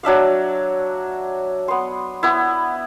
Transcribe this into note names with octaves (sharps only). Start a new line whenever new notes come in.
F#3 D4 E5 F5
B3 C6
B3 E4